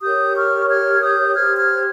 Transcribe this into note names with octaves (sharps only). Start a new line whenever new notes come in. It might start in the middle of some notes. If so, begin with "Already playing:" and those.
G4 A#4 C#5 D#6 G6
C#6 F6
F6 G#6
D#6 G6
G4 C5 F6 G#6
F6 G#6